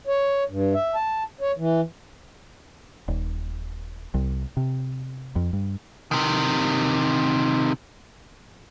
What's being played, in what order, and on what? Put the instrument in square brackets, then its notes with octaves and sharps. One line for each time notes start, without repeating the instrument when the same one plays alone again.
[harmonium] C#5
G2
E5
A5
C#5
E3
[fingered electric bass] D#1
C2
C3
F2
G2
[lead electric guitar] C3 D#3